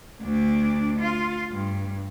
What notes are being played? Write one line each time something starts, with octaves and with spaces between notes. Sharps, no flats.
D2 D4
F4
G2